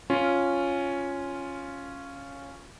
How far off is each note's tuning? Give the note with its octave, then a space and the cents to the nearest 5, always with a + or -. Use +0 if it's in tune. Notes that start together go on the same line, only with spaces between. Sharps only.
C#4 +0 F4 +0